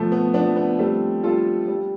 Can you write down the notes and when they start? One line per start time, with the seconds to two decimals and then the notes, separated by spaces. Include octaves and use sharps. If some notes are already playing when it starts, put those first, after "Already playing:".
Already playing: B2 F3 A3
0.12 B3
0.34 F3 B3 D4
0.56 B3
0.79 G3 A3 C4
1.23 G3 F4 A4
1.68 G3